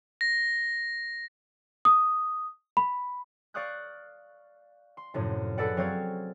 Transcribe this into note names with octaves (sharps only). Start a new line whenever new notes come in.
A#6
D#6
B5
D5 F5 C#6 D#6 F#6 G6
C6
F1 F#2 A2
G#4 A4 B4 D5 F#5
F#3 C4 C#5 D5 F5 G#6